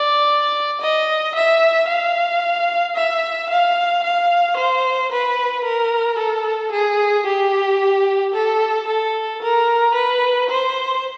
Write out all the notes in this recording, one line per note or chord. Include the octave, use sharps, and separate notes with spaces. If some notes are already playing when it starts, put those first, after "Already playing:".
Already playing: D5
D#5
E5
F5
E5
F5
F5
C5
B4
A#4
A4
G#4
G4
A4
A4
A#4
B4
C5